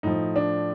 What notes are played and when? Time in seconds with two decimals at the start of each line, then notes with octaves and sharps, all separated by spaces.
0.03 A2 F3 D#4
0.36 D4